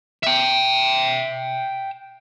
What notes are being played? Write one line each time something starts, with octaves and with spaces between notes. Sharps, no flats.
E5 G5